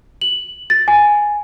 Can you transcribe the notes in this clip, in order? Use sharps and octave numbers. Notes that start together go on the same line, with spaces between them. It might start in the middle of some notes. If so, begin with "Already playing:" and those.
F#7
A6
G#5